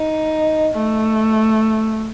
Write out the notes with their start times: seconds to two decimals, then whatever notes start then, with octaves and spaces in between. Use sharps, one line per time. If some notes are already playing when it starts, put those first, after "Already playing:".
Already playing: D#4
0.74 A3